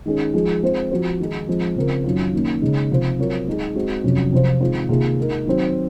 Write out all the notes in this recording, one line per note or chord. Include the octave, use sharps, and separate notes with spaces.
D#3 G#3 C#4 G#4
F3 G#3 D#4 G#4
G#3 C4 F4 C5
F3 C4 F#4 C5
D#3 G#3 D#4 G#4
F3 G#3 C4
C#3 F3 C4 F4 A#4
F#2 D#3 F#3 C#4 F4
D#3 A#3 C#4
C#3 G#3 D#4
C3 F3 C4 F4 C5
F#3 C4 F4 A#4 C#5
G#3 D#4 G#4
G#3 C4 F#4
F2 C3 F#3 C#4 F#4
C3 F3 C4 F4 C5
D#3 G#3 C4 F4 C5
C3 D#3 A#3 F4 G#4
G#3 D#4 A#4
D#3 F#3 C4